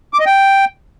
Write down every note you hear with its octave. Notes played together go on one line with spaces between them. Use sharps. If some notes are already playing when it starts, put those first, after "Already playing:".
D6
D#5
G5